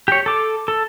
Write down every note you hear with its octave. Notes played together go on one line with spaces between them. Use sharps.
G4 C#5
A4 D6
A4